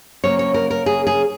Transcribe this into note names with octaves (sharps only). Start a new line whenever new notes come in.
C#3 F#3 A#3 C#4 C#5
C#5
A#4
A#4
G#4
G#4